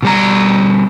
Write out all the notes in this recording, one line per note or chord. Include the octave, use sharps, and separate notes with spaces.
B2 G3 A#5